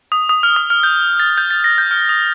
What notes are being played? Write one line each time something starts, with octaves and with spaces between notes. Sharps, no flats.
D#6
D#6
F6
D#6
F6
G6
A6
G6
A6
A#6
G6
F6
D#6